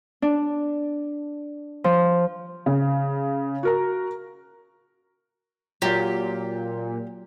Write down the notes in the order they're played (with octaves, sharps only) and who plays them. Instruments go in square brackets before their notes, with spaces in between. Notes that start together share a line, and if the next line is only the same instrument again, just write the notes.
[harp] D4
F3
[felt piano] C#3
F#4 A#4 A#5
[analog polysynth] A#2 [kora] F#3 F4 [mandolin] G4